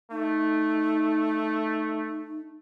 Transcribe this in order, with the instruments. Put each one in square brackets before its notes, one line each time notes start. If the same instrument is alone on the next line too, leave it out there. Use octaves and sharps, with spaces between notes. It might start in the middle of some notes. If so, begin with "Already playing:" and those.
[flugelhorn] A3 [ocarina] D#4